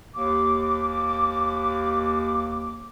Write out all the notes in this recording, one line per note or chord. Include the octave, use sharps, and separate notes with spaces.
D#2 D6